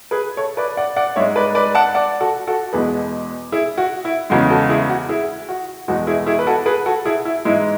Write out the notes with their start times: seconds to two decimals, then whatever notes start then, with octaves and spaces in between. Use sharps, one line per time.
0.11 G#4 B4
0.37 A4 C#5
0.57 B4 D5
0.77 D5 F#5
0.96 D5 F#5
1.16 G#2 G#3 C#5 E5
1.36 B4 D5
1.55 B4 D5
1.75 F#5 A5
1.95 D5 F#5
2.20 F#4 A4
2.47 F#4 A4
2.73 E2 B2 G#3 G#4 B4
3.52 E4 G#4
3.78 F#4
4.05 E4
4.30 E2 C#3 G#3 F#4
4.50 F#4 A4
4.69 E4 G#4
4.90 F#4
5.09 E4 G#4
5.49 F#4
5.88 E2 B2 G#3 F#4
6.07 E4 G#4
6.26 E4 G#4
6.39 B4
6.47 F#4 A4
6.66 G#4 B4
6.86 F#4 A4
7.05 E4 G#4
7.25 E4
7.45 G#2 E3 G#3 E4